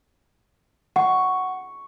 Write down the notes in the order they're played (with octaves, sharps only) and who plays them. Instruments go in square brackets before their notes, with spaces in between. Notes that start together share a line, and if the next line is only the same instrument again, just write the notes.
[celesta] F#5 [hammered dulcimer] C#6